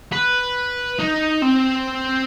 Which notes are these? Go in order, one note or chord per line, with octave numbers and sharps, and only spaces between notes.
B4
D#4
C4